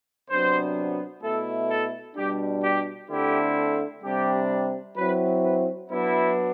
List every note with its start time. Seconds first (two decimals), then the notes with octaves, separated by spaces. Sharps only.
0.29 C3 F#3 B3 D4 C5
1.23 B2 A3 E4 A4
1.69 A4
2.16 B2 G3 D4 G4
2.63 G4
3.09 D3 A3 C4 E4 G4
4.02 C3 G3 D4 G4
4.95 F#3 C4 E4 B4
5.42 B4
5.89 F#3 B3 D4 E4